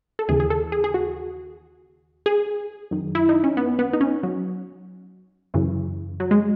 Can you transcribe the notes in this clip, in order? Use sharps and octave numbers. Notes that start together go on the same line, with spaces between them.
A4
D#2 C#3 E3 G#4
G#4
A4
G#4
G#4
F#4
G#4
F#2 D#3
E4
D#4
C#4
B3
B3
D#4
C#4
F#3
F#2 C#3 E3
F#3
G#3